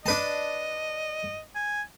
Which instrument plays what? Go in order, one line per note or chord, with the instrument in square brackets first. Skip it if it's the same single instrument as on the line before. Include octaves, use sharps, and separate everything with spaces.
[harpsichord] D4 B4 A5 [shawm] D#5
[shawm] G#5